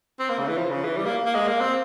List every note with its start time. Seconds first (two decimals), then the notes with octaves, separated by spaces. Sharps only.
0.20 C4
0.30 A#3
0.39 C#3
0.48 E3
0.58 F3
0.71 C#3
0.84 E3
0.96 G3
1.06 A#3
1.25 A#3
1.35 G#3
1.48 A#3
1.60 C4